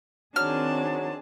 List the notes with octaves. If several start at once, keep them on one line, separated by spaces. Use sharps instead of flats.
D#3 F#3 C4 D4 G#4 A5 F6